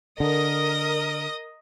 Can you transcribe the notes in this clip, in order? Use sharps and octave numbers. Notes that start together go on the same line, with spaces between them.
D3 A#4 D#5 D#6